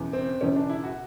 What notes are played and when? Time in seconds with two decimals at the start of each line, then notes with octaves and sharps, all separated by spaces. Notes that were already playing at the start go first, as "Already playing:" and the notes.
Already playing: E1 E2 C#3 E3
0.13 C4
0.41 E1 E2 C#3 E3 C#4
0.56 D4
0.70 E4
0.84 F#4